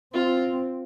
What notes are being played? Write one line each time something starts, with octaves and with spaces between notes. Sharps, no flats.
C4 F4